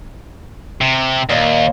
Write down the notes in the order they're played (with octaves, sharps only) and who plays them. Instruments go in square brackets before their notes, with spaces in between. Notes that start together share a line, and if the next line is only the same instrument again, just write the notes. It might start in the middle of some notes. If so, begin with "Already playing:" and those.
[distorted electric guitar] C3
[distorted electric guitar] D#2 [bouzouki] A#2 A#3 D#5